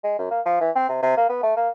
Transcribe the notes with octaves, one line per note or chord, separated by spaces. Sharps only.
G#3
F#2
A#3
F3
E3
C4
C3
C3
A#3
B3
A3
A#3